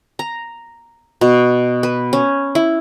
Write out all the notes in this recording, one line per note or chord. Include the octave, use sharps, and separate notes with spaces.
A#5
B2
B4
C#4
E4